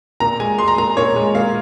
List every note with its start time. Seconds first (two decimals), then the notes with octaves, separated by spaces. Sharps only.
0.20 A#2 A#5
0.40 G#3 G#5
0.58 G#3 C6
0.68 A#5
0.78 A#2 A#5
0.97 A#2 C#5
1.16 G#3
1.35 A#2 F5